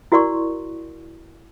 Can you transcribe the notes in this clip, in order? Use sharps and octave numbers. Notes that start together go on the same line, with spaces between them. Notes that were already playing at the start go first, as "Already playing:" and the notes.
E4 F#4 A#4 D5 C6 C#6